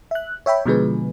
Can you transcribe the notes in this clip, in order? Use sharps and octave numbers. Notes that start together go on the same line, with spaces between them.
E5 F#6
C#5 E5 G5 B5
B2 D3 F3 G#3 G#4 B4